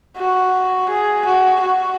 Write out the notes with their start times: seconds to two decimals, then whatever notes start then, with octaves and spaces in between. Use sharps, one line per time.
0.17 F#4
0.89 G#4
1.25 F#4
1.61 F#4